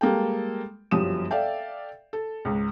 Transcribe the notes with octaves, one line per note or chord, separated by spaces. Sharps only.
G3 G#3 A#3 A4 G5
G1 F#2 F3 G4 D#6 E7
A4 D5 E5 F5 G5
A4
C#2 G#2